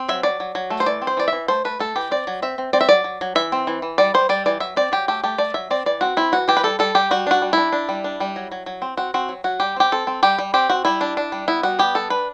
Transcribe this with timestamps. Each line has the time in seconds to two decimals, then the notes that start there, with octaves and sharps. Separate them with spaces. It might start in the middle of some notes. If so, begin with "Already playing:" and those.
Already playing: C4
0.09 F#3 E5
0.23 F#3 D5
0.40 F#3
0.55 F#3
0.70 A3
0.80 C5
0.86 E3 D5
1.02 C4
1.07 C5
1.17 E3 D5
1.28 E3 E5
1.48 A3 C5
1.65 A3 B4
1.79 A3 A4
1.96 E3 G4
2.11 C4 D5
2.27 F#3
2.42 C4 E5
2.58 C4
2.73 C4 D5
2.81 E5
2.89 F#3 D5
3.04 F#3
3.21 F#3
3.35 E3 E5
3.52 C4
3.67 E3
3.82 E3
3.98 G3 D5
4.14 G3 C5
4.29 G3 D5
4.46 E3 D5
4.60 F#3 E5
4.76 C4 D5
4.92 F#3 G4
5.08 A3 G4
5.24 A3 G4
5.38 A3 D5
5.54 F#3 E5
5.70 C4 D5
5.86 E3 D5
6.01 C4 F#4
6.17 C4 E4
6.32 E3 F#4
6.48 E3 G4
6.57 B4
6.63 G3 A4
6.79 G3 A4
6.95 G3 G4
7.11 G3 F#4
7.27 D4 F#4
7.42 G3
7.53 D4 E4
7.72 D4
7.89 G3
8.04 D4
8.20 G3
8.36 F#3
8.52 F#3
8.66 F#3
8.82 C4
8.97 C4 F#4
9.14 C4 F#4
9.29 F#3
9.44 F#3 F#4
9.60 G3 G4
9.76 C4 G4
9.92 C4 A4
10.07 C4
10.23 G3 G4
10.39 G3
10.54 C4 G4
10.70 C4 F#4
10.85 G3 E4
11.01 D4
11.17 D4
11.32 G3
11.48 B3 E4
11.63 G3 F#4
11.79 B3 G4
11.95 G3 A4
12.10 D4 B4